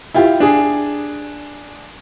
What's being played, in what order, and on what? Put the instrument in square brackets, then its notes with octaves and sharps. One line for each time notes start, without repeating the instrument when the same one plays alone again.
[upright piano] E4 F4 G4
D4 G#4